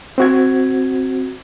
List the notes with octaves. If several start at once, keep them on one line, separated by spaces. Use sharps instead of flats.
C4 F#4 G#6